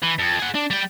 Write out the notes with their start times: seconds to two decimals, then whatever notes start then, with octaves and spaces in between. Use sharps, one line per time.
0.03 E3
0.19 F2
0.39 G#4 F#5
0.55 D4
0.70 G3 G5